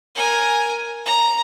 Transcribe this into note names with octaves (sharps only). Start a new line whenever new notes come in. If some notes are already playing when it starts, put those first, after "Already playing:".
A#4 G#5
A#5